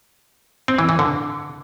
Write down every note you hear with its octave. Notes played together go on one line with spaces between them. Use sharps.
C4
E3
E3
D3